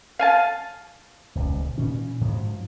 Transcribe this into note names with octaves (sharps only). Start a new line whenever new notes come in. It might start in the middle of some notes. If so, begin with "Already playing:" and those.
F5 G#5 A5
D#1 C#2
A#2 E3 C#4
G#2 F3 F#3